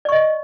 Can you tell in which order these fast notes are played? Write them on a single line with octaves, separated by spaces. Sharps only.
D5 C#6 D#5